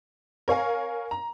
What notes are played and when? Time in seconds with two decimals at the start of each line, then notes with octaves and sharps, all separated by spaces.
0.48 A#4 C#5 F5 G#5
1.11 A#5